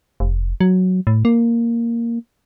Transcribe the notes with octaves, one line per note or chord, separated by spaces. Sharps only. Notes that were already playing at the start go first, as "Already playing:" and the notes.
F1
F#3
A2
A#3